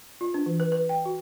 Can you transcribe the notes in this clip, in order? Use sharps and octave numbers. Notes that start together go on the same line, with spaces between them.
F4
D4
E3
B4
B4
G5
F#4